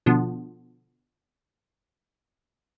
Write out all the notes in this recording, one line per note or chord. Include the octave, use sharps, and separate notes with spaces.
B2 D3 F3